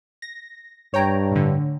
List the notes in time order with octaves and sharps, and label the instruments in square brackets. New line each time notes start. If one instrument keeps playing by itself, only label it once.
[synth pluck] A#6
[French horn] G2 [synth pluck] C#5 G5 A#5
[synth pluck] A2 D3